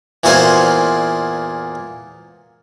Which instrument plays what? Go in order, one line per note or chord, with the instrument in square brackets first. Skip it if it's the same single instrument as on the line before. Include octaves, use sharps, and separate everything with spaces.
[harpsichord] E2 A#2 E3 F#4 C5 G#5